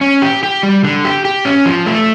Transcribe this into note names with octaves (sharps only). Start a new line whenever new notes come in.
C#4
G4
G4
G3
D3
G4
G4
C#4
F3
A3